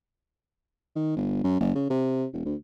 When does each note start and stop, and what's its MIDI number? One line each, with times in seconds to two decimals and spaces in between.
0.96 1.15 51
1.16 1.43 31
1.44 1.58 42
1.60 1.73 30
1.75 1.88 49
1.90 2.25 48
2.33 2.44 28
2.45 2.55 38